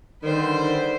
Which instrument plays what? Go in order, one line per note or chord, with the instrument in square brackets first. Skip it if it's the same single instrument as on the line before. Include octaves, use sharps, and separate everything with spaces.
[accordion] D3 G3 [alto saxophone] D#3 [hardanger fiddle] B4 C5